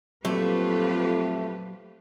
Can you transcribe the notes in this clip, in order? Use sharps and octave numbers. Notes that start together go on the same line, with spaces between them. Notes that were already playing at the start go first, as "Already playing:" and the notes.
F2 A#2 F#3 A3 F4 G4 B4